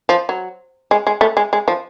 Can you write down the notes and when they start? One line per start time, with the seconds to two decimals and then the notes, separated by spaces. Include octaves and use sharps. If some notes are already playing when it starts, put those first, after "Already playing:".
0.09 F3
0.29 F#3
0.91 G#3
1.07 G#3
1.21 A3
1.37 G#3
1.53 G#3
1.68 F3